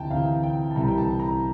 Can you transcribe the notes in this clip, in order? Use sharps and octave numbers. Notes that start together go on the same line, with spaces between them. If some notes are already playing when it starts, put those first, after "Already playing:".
Already playing: D2 C3 E3 G5 A5 A#5
D2 C3 E3 F5
G5
A5
C2 C3 E3 G3 A#5
G5
A5
A#5